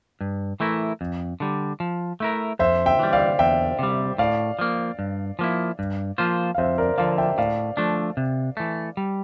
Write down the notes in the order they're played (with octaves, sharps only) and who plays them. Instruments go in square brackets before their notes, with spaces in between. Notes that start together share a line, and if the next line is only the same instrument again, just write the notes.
[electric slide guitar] G2
E3 A3 E4 A#4
F2
D3 G3
F3
A3 E4 A#4
[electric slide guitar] F2 [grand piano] C5 E5
[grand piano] E5 G5
[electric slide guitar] E3 G3
[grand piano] D5 F5
[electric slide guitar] E2 [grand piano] E5 G5
[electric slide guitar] C3 G3
[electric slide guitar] A2 [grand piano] D5 F5
[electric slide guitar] F3 A#3
G2
F3 A#3 E4
G2
F3 A#3 F4 C5
[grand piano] F5
[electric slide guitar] F2 [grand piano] C5 E5
[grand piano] A#4 D5
[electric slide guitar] D3 F3 [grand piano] D5 F5
[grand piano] E5 G5
[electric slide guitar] A2 [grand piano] D5 F5
[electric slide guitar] F3 A3 D4
C3
E3 A3
G3